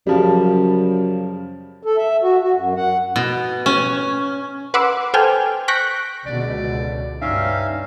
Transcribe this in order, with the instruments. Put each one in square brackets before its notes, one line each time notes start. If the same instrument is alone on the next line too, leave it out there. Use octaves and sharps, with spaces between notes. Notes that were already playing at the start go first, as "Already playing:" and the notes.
[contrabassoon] F#2 [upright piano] C#3 F3 G3
[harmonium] A4
E5
F#4
F#4
F#2
F#5
[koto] B2
C#4
[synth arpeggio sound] B4 F#5 C6 D6 E6
A4 C5 G5 G#5 F6
C#6 F#6 G6 A#6 B6 D7
[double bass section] C#2 B2 D3 [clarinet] D5
[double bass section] G2 [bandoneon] C#4 E5 F5 [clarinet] D#4